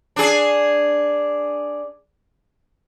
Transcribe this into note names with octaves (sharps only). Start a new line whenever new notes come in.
D4 G#4